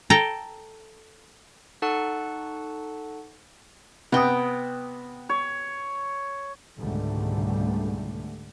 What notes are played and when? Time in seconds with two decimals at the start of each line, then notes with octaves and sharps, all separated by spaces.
0.10 A4 G5 A#5
1.82 D#4 A4 F#5 A5 C#6 F#6
4.12 C3 B3 G5 D#6
5.29 C#5
6.79 C#2 G#2 B2 D3 G3 A3